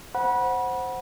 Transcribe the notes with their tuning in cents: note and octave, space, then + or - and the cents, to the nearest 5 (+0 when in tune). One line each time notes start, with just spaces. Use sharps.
C5 +0 F#5 +0 B5 -30